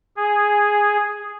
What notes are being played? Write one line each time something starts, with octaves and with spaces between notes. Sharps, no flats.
G#4